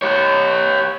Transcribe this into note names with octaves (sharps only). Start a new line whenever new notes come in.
G4 C#5